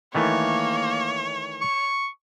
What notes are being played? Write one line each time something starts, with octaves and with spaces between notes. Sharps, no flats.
D#3 E3 A3 A#3 C#5
C#6